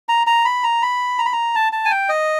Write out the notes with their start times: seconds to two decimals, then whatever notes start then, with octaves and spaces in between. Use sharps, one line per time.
0.09 A#5
0.27 A#5
0.45 B5
0.64 A#5
0.82 B5
1.19 A#5
1.26 B5
1.33 A#5
1.55 A5
1.73 A5
1.85 G#5
1.91 G5
2.09 D#5